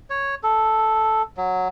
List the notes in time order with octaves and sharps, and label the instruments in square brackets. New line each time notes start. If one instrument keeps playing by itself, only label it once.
[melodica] C#5
A4
F#3